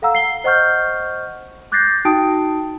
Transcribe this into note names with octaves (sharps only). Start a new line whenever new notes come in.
A4 F5 F#5 A#5 E6
C7 G7
C5 D#5 F#5 C#6 F6 G6
D6 F#6 G6 A6 A#6 C7
D#4 F#4 G5 A5 D#6 D7